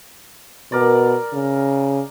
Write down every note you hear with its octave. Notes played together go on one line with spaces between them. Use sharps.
B2 A#4 D5
C#3